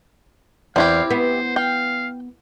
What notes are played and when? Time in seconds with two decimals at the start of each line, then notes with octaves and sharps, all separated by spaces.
0.76 E2 C4 E4 G4 F5
1.10 B3 C5
1.56 F5 G5